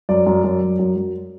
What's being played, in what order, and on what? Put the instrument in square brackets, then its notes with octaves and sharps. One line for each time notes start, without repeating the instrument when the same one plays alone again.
[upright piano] F#2 D5
F#2
F#2
F#2
F#2
F#2